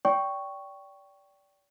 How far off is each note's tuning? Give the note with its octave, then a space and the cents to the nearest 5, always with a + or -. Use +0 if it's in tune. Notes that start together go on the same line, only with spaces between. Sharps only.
D5 -30 G5 -5 C#6 +0